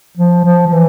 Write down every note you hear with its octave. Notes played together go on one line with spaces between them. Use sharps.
F3
F3
F3
E3